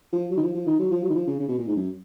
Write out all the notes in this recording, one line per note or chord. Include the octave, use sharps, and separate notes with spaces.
F3
F#3
D#3
F3
F3
D#3
F#3
F3
F#3
D#3
F3
C#3
C#3
B2
A#2
G#2
F#2